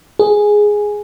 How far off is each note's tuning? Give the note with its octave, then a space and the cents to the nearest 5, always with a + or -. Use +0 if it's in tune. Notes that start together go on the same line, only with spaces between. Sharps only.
G#4 +0